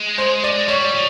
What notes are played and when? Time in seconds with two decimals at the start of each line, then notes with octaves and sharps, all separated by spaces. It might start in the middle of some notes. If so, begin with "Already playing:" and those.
Already playing: G#3
0.18 C5
0.44 D5
0.68 G3 C#5
0.85 D5
0.93 F3